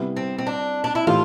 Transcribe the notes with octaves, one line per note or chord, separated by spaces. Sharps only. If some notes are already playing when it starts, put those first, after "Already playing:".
Already playing: C3 G3 B3 E4
C4
C4
D4
D4
E4
A2 E3 A3 E4 F4 G4